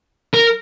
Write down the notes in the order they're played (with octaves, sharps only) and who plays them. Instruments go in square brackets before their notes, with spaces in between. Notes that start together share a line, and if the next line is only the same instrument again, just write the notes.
[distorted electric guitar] A#4